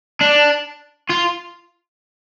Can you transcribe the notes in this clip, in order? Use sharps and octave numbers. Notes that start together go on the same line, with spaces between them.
D4
F4